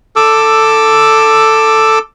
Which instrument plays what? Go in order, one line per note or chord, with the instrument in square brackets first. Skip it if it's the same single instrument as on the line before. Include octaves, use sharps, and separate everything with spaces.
[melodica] A4 D6 E6